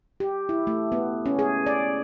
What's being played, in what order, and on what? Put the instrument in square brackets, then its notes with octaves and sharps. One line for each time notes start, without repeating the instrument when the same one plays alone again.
[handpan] G4
E4
A3
B3
C#4
G#4
D5